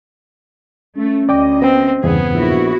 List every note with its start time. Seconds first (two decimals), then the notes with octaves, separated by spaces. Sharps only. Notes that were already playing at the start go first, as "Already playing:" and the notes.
0.97 A3 C#4
1.29 D2 D5 D#5 G5 D6
1.62 B3 C4 G5
2.04 E2 G2 C#3 B3 G#4
2.34 A#1 E4 F#4